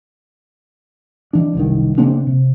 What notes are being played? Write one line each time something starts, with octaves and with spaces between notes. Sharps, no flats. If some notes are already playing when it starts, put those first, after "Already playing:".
E3 D4
F#1 C2 D#3
C#3 A#3 C4 D4
C3